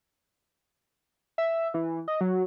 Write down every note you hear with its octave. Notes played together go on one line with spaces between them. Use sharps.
E5
E3
D#5
F#3